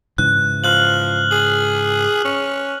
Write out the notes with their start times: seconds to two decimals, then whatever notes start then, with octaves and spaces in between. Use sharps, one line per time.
0.18 G#2 C#3 E3 F#6
0.64 F3 F6 F#6 F#7
1.31 G#4 F#7
2.25 C#4